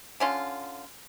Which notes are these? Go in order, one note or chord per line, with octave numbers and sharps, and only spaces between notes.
D3 C#4 F4